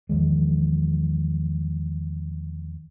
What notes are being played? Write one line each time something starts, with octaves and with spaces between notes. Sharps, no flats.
E2 D#3 F3 G#3